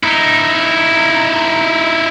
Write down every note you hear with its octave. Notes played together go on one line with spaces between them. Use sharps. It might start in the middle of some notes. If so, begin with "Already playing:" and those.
D#4 E4